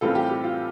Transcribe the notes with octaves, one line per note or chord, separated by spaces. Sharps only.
A2 E3 G3 C4 F4 A4
G4
G4
F4